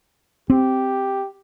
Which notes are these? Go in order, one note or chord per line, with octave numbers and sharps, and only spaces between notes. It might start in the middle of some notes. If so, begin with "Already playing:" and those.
C4 G4